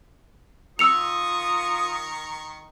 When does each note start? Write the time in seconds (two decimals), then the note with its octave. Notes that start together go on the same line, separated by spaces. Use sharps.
0.79 D#3 F4 A#4 C#6 D#6 E6 C#7 F7